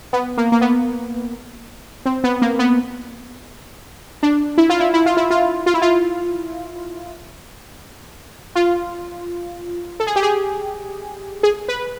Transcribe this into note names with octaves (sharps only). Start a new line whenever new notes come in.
B3
A#3
A#3
B3
C4
B3
A#3
B3
D4
E4
F4
E4
E4
F4
E4
F4
F4
E4
F4
F4
A4
G#4
G4
G#4
G#4
B4